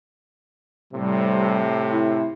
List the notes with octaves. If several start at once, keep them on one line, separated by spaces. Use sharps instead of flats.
A2 C3 G3
E4